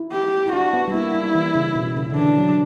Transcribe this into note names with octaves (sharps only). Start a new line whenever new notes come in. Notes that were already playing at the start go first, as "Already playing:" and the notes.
Already playing: E4
G4
E4
D4 F#4
B3
G3
A#3 E4
G3
E3
C#3
B2
C#3
D3
E3 D4
F#3